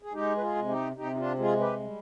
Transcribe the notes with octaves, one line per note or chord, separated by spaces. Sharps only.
G#4
G#3 D#4 G4
B4
F4 G#4
C3
D#4 G4
C3 D#4 G4
D#4
D4 F4
G#3 F4 G#4
G4 B4
G3